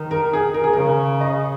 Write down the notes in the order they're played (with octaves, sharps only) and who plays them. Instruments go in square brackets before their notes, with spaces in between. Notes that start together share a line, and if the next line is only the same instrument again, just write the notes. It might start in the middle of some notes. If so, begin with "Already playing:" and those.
Already playing: [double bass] D#3
[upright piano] A#4
G#4
A#4
G#4
[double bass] C#3 [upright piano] A#4
[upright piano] D#5